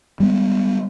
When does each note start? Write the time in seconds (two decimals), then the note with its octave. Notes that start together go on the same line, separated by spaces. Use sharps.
0.20 G3 G#3 B3